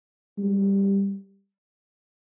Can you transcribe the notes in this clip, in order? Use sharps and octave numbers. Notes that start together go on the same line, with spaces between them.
G3